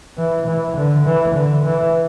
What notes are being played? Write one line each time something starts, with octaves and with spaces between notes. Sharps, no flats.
E3
E3
D3
E3
D3
E3